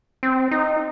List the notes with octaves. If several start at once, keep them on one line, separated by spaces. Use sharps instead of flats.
C4
D#4